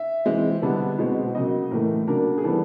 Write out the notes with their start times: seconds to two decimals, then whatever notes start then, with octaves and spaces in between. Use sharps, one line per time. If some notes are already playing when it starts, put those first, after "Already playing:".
Already playing: E5
0.25 E3 G#3 C4
0.62 D3 G3 B3 D4
0.98 B2 G#3 C4
1.35 C#3 F#3 A#3 D#5
1.71 A2 E3 A3 A#4
2.07 C#3 F#3 A#3 D4 A#4
2.38 G#4
2.44 E3 G3 B3 A4